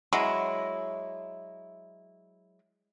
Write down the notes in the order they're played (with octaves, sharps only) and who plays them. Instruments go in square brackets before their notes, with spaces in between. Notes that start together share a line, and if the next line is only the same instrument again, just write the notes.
[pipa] F#3 G#3 E4